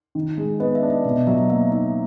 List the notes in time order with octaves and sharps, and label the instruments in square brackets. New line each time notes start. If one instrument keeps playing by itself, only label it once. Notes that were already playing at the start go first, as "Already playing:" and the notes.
[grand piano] D#3
G#3
[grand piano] B3 [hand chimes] D#5
[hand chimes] E5
[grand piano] D4
[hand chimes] D#5
[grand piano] B2 [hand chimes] E5
[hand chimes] D#5
[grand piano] F#3 [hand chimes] E5
[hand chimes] D#5
[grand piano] A#3 [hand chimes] E5
[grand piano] D#4 [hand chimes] E5